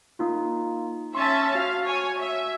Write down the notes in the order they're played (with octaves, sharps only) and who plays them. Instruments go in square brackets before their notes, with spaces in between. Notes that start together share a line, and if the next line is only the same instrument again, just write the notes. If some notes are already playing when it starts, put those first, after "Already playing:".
[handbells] A#3 D#4 F4
[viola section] C#4 E5 A5 [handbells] C6
[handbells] F#4 [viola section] F5
[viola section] C#5 G#5
E5